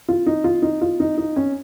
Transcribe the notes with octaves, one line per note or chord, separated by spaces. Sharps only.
F4
D#4
F4
D#4
F4
D#4
D#4
C#4